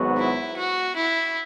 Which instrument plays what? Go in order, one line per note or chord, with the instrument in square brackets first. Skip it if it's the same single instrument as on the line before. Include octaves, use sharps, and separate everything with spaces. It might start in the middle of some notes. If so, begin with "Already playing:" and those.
Already playing: [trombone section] G#1 G#2 F#3 B3 F#4
[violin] E4
F#4
E4